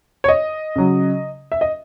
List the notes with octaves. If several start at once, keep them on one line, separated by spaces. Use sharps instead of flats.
C#5
D#5
C#3 F#3
E5
D#5